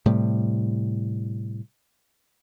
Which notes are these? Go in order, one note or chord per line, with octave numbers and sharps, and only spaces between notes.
A2 C3 G3